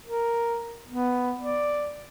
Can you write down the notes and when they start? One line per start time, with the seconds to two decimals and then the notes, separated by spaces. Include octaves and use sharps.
0.04 A#4
0.88 B3
1.40 D5